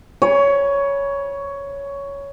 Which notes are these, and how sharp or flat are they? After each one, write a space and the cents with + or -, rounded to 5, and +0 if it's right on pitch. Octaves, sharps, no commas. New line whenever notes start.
C#5 +10 G#5 +0 B5 -30